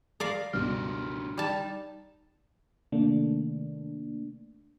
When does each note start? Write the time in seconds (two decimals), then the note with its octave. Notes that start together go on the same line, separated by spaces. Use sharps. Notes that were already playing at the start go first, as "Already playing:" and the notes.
0.20 A#4 D5 F5
0.53 C#2 G2 B2 D4 F#4 G4 F6
1.38 G3 D#4 A5
2.92 C3 D#3 A3 A#3 D4